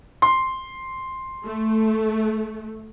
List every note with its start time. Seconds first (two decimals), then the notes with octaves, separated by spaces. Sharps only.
0.22 C6
1.45 A3